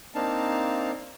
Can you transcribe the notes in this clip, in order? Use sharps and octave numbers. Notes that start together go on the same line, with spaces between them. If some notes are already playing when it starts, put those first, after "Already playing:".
A#3 C4 D4 D#4 F5 A5